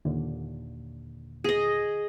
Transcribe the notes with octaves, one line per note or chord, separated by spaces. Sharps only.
D#2 A#2 D3
G#4 D#5